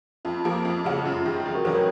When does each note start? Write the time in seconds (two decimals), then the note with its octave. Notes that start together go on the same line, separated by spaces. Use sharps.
0.25 F2 F4
0.45 F3 A#3
0.65 F2
0.85 C#3 G#3 C#4 F#4
1.05 F#2 F4
1.26 D#3 G#3
1.45 F1
1.55 F#4 A#4
1.65 D#3 F#3 C#4 G#4 B4
1.75 A#4 C#5